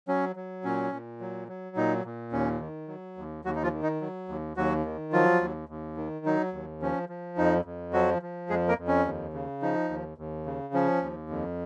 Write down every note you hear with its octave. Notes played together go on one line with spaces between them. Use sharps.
F#3 C#4
F#3
A#2 C#4
A#2
F#3
F#3
A#2 D#4
A#2
D#2 C#4
D#3
F#3
D#2
D#2 F#3 F#4
D#4
F3 F4
D#3
D#4
F#3
D#2
D#2 F#3 F#4
D#3
F3 F#3 F4
D#2
D#2
D#3
F#3 D#4
D#2
F3 C#4
F3
F2 D#4
F2
F3 F#3 F#4
F3
F2 G#3 G#4
A#3 A#4
F2
C#4
D#2
C#3
F3 D#4
D#2
D#2
C#3
F3 C#4
D#2
F2